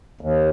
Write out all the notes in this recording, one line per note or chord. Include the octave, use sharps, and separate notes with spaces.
D#2